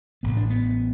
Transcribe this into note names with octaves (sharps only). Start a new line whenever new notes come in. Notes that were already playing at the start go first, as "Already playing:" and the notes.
A1 A2 B3
D4
B3